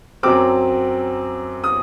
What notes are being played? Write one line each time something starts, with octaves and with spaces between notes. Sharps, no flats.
F#2 F#3 C4 D6
D#6